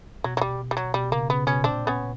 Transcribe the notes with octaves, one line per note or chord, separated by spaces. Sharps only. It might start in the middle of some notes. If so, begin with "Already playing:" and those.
B2 F#3
F#3
G3
G3
F#3
B2 G3
C#3 A#3
C#3 B3
B2 B3 C#4
A#2 C4 D4
B3 C#4